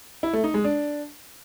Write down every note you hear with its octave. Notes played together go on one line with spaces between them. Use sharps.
E4
A3
D#4
G#3
D4